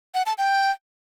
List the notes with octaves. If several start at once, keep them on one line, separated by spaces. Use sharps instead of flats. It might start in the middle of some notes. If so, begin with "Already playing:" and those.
F#5
A5
G5